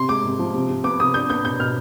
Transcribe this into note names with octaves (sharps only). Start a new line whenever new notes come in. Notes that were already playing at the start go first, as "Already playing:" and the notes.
Already playing: C3 C6
G#3 D6
C3
F3
C3
C3
B3 D6
C3 D#6
D4 G6
B3 G6
B2 G6
B2 F6